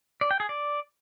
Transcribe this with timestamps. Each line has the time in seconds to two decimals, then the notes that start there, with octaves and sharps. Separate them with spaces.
0.21 D5
0.31 G5
0.40 G#4
0.49 D5